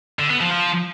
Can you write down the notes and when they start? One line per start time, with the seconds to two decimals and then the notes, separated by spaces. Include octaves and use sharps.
0.19 D3
0.30 B3
0.41 F3
0.52 F3